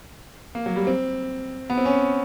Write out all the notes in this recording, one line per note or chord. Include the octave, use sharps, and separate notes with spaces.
A#3
F#3
G3
C4
B3
C4
C#4